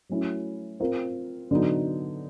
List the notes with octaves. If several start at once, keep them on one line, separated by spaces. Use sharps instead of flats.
F#3 A3 C#4 E4
C4 F4 A#4
D3 F#3 B3 D#4